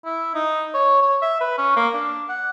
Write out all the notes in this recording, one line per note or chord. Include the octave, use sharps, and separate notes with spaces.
E4
D#4
C#5
C#5
E5
B4
C#4
A#3
D4
F#5